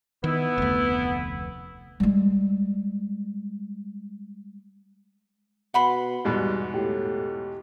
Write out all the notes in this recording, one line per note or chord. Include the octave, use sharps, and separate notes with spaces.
D#3 B3 E4
F1 D2
G3 G#3
B2 F#5 B5 C6
E2 G#2 B2 G3
A2 G4